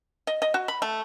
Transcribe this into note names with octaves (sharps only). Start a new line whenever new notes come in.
D#5
D#5
F#4
B5
A3